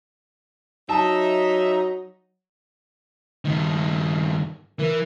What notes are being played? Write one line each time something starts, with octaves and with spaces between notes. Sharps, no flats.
F#3 D#4 E5 A5
G2 D#3
E3 A#4